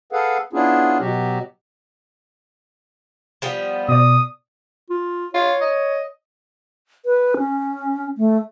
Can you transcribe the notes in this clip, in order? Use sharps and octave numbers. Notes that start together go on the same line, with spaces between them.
G#4 A4 B4 F5 F#5
B3 C#4 D4 E4 F4 G#4
B2 F#3 F#4 G4
F3 G3 B3
B2 D5 D#6
F4
F4 C#5
D#5
B4
C#4
A3